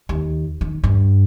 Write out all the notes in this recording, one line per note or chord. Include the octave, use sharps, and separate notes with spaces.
D#2
D#3
G2